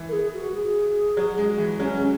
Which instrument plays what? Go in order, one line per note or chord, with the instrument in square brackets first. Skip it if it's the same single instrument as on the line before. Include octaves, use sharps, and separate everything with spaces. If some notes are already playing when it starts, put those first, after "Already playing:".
Already playing: [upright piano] E3
[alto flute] A#4
G#4
F#4
G#4
[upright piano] F#3
G#3
E3
[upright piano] F#3 [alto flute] C#4
[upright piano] G#3